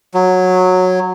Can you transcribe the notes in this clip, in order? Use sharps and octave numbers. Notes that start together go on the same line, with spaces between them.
F#3